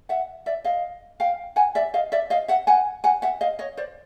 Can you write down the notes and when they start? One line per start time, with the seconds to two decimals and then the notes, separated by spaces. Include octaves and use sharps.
0.09 E5 F#5
0.46 D5 E5
0.64 D#5 F5
1.20 F5 G5
1.56 F#5 G#5
1.75 D5 E5
1.94 D#5 F5
2.12 D5 E5
2.30 D#5 F5
2.48 E5 F#5
2.67 F#5 G#5
3.04 F#5 G#5
3.22 E5 F#5
3.41 D#5 F5
3.59 C#5 D#5
3.77 C5 D5